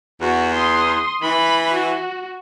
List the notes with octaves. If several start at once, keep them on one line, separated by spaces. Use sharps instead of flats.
E2 F#4
C6 D#6
E3 B5
F#4